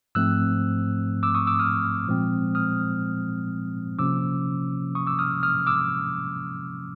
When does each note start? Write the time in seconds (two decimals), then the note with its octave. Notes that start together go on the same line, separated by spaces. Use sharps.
0.15 G#2 F3 A3 C4 E6 F#6
1.23 D6 E6
1.35 C#6 D#6
1.47 D6 E6
1.59 D#6 F6
2.07 A#2 F3 G#3 C4
2.55 D#6 F6
3.99 C3 F3 A#3 C#4 D6 E6
4.95 C#6 D#6
5.07 D6 E6
5.19 D#6 F6
5.43 D#6 F6
5.67 D6 E6